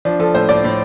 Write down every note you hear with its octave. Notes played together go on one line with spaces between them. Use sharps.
F3 D4
F3 A4
A2 C5
A2 D5
A2